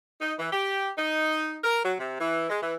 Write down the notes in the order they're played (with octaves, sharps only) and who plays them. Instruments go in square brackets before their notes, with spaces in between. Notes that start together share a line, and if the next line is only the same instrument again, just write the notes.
[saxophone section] D#4
E3
G4
D#4
A#4
F#3
C3
E3
G#3
E3